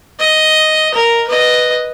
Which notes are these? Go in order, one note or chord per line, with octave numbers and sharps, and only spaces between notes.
D#5
A#4
B4 D#5